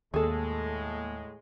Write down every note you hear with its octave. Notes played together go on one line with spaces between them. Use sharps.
D#2 A2 G#3 A#3 G#4 A4